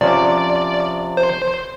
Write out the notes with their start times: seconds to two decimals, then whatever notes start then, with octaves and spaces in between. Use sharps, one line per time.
0.01 C3 F3 C#4 D5
1.17 C5